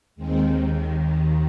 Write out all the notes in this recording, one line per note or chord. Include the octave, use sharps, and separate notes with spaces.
D#2 D#3 G#3 C4